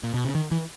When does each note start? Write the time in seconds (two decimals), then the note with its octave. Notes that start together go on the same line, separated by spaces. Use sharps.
0.03 A#2
0.14 B2
0.25 C#3
0.35 D#3
0.51 E3